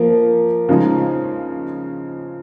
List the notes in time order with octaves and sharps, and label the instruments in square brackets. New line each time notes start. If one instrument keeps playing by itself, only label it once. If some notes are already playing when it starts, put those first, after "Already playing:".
Already playing: [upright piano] F3 A#3
C#3 F3 G#3 D#4